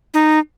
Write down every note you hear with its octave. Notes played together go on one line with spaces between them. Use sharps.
D#4